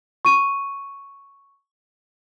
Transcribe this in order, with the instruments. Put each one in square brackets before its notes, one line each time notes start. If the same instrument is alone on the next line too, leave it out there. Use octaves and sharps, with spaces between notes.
[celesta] C#6 D#7